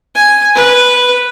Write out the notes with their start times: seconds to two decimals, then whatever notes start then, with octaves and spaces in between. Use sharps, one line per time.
0.15 G#5
0.55 B4